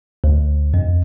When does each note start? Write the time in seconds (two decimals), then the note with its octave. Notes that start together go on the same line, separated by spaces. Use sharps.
0.24 D2
0.74 F2